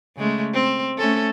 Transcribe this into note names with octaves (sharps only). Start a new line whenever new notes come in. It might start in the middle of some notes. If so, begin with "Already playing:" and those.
C#3 G#3 A3
C4
A3 C#4 A4